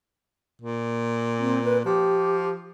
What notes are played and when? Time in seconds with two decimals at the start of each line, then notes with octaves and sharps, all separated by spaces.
0.61 A#2
1.39 C4
1.64 B4
1.85 F3 G4